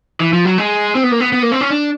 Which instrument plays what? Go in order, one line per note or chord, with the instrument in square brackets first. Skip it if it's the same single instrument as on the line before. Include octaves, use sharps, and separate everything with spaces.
[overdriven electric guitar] E3
F3
F#3
G#3
C4
B3
A#3
B3
B3
A#3
C4
C#4
D4